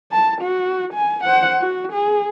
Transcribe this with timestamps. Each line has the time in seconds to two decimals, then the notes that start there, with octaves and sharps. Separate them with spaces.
0.12 A5
0.41 F#4
0.94 G#5
1.24 C5 F#5
1.61 F#4
1.93 G#4